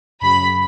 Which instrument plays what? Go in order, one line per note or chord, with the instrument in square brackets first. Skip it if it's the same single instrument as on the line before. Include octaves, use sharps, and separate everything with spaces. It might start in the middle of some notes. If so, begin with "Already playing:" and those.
[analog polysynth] F#2 C#3 F#3 [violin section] B5